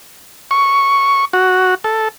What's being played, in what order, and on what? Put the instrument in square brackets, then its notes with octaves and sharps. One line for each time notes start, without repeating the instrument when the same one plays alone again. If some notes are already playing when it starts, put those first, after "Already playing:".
[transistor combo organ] C#6
F#4
A4